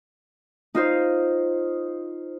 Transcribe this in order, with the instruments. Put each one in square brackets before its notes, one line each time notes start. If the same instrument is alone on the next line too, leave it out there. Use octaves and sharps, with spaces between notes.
[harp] D#4 F4 C5